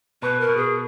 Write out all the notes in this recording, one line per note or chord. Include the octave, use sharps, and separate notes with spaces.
B2 B4
A#4
B2
G#4